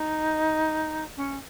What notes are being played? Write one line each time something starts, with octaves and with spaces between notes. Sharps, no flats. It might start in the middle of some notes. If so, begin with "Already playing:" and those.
Already playing: D#4
C#4